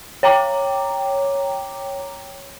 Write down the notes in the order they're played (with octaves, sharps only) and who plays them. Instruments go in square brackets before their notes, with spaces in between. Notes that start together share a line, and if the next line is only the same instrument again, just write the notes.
[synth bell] C#5 G5 A#5 D6